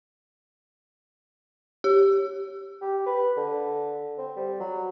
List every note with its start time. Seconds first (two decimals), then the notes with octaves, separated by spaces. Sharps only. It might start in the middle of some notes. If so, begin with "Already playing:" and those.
1.84 G4
2.81 G4
3.06 B4
3.37 D3
4.18 C4
4.36 G3
4.60 F#3